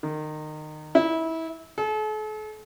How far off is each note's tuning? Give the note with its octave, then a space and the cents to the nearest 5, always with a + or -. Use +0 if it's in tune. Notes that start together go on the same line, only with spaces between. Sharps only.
D#3 -25
E4 -25
A4 -45